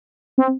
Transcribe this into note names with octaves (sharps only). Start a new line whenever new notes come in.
C4